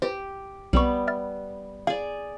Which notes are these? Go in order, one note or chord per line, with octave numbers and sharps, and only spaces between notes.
G4 B4 C5
B1 G3 B3 C4 C#6
E5 F6 A6
G#4 D5 F5